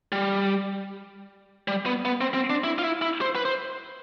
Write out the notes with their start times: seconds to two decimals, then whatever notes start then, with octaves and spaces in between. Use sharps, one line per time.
0.12 G3
1.68 G3
1.86 B3
2.05 B3
2.21 C4
2.34 C4
2.50 D4
2.64 E4
2.79 F4
2.84 E4
3.02 E4
3.21 C5
3.35 B4
3.45 C5